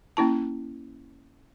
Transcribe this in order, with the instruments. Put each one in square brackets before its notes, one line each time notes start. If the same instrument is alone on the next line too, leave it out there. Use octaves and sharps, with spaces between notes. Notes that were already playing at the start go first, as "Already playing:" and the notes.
[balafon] A#3 C#4 E4 A5